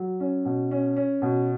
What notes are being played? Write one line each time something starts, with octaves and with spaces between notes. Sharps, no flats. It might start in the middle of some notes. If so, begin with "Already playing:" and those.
Already playing: F#3
C#4
B2
C#4
C#4
B2